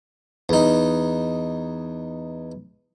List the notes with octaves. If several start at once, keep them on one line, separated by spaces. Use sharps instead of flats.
E2 D#4